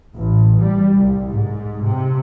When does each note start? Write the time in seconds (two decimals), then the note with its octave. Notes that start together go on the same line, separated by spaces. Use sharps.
0.15 A1
0.60 G3
0.95 C2
1.30 G#2
1.84 C3